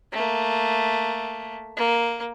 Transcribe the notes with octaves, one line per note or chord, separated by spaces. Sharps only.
A3 A#3
A#3